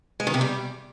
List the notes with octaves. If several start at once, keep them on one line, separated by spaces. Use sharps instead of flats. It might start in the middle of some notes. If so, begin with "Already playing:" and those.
G#3
D#3
C3
G3